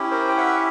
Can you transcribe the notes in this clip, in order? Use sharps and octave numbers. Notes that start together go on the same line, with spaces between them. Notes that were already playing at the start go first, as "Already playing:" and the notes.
Already playing: C#4 E4 G4
A#4 C5
G5
E5 F#5